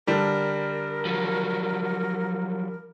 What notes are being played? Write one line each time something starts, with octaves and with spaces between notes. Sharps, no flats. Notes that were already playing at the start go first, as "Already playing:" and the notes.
D3 G3 D4 A#4
F3 F#3